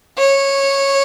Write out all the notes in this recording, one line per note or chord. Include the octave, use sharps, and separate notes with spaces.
C#5